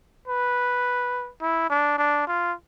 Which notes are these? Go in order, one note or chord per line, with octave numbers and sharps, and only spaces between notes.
B4
E4
D4
D4
F4